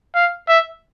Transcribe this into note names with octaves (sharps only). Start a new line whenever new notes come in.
F5
E5